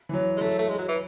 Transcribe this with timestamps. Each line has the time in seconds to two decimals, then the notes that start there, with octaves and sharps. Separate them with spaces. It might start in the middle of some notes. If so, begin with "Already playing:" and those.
0.09 E3
0.13 F#3
0.37 G#3
0.41 F#3 A3
0.59 A3
0.69 G#3
0.79 F#3
0.88 E3